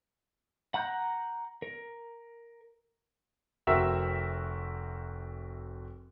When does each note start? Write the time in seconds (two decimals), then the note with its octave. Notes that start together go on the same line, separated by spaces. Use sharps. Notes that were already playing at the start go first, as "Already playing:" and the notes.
0.74 F#5 A#5 F#6 G6
1.62 A#4
3.67 F1 C4 F#4 A#4 E5 E6